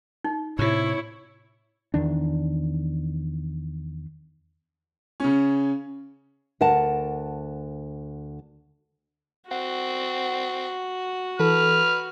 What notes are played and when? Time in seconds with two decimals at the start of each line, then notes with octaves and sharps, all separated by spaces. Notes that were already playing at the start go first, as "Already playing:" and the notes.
0.25 D#4
0.59 A2 C3 E4 C#5
1.94 E2 D#3 D4
5.20 C#3 C#4
6.61 D2 A#4 F#5 A5
9.51 C4 F#4 F#5
11.40 E3 A4 B4 F6